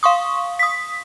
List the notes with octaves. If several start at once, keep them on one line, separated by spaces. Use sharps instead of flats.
F5 C6 C#6 D#6
D#6 B6